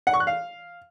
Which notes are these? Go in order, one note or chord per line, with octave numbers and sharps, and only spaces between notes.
F#5
C#6
F#6
F5